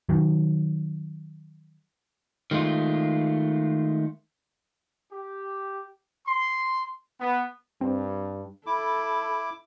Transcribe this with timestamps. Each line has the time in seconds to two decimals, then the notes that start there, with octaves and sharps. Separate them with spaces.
0.09 D#3 F#3
2.51 D#3 G#3 A3 F4
5.12 G4
6.27 C6
7.20 B3
7.81 G2 C4
8.66 E4 A4 B5 D6